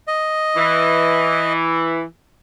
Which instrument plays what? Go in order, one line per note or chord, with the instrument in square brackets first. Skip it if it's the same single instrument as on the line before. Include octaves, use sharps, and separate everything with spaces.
[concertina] D#5
[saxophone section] E3